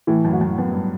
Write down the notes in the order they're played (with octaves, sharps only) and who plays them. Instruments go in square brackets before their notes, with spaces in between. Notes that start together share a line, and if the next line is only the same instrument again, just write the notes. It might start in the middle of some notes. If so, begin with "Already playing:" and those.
[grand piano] A2 [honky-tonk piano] E3
[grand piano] F#2
[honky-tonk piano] F#4
[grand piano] F#2
[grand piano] F#2 [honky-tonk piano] B3
[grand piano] G2